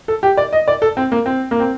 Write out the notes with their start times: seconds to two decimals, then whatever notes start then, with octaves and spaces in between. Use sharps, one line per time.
0.08 A4
0.23 G4
0.37 D5
0.52 D#5
0.68 D5
0.82 A4
0.97 C4
1.12 A#3
1.26 C4
1.51 A#3
1.60 C4